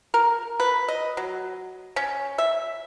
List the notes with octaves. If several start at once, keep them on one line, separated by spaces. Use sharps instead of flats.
A#4
B4
D#5
F#3
C#4
E5